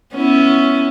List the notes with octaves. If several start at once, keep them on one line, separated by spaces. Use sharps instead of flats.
B3 C#4 E4